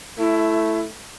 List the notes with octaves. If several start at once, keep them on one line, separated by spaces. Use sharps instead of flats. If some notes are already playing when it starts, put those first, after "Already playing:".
A3 E4